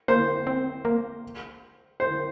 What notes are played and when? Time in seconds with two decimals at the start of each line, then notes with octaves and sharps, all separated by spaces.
0.08 A#3 C5
0.47 C4
0.85 A#3
2.00 C5